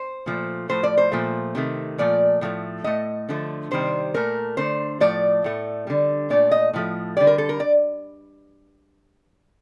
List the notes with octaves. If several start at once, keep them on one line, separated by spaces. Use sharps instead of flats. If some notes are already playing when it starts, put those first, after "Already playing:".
Already playing: C5
A#2 F3 A3
A2 F3 A3 C5
D5
C5
A#2 F3 A3
C3 D#3 A3
A#2 F3 A3 D5
A2 F3 A3
A2 A3 D#5
D3 F3 A3
C3 D#3 G3 C5
A#2 A3 A#4
D3 A3 C5
A2 F3 A3 D5
A2 A3
D3 G3
A#2 A3 D5
D#5
A2 F3 A3
D3 G3 D5
A#4
A4
A#4
D5